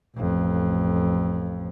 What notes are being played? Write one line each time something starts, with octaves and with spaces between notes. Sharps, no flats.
A1 F2